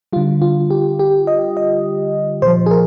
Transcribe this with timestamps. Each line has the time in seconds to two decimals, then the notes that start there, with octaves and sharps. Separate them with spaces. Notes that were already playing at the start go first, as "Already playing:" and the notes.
0.13 D3 G3 F4
0.42 F4
0.70 G4
0.99 G4
1.27 D#5
1.57 D#5
2.42 A#2 F3 C5
2.66 G#4
2.71 A#4